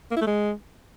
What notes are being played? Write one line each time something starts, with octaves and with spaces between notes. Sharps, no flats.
A#3
E4
A3
G#3